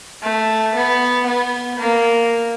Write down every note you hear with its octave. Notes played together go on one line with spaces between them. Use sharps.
A3
B3
B3
A#3